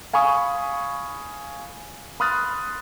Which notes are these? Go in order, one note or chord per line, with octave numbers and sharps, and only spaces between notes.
F5 G#5 B5 C#6 D#6
B5 C6 D#6 F6 F#6 A6